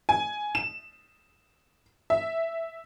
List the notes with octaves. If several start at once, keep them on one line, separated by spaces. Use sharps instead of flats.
G#5
E7
E5